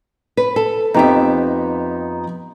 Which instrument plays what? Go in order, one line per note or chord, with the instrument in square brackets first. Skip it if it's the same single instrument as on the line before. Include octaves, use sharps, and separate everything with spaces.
[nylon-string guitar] B4
A4
[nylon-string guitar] F2 G4 E5 [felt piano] B3 D#4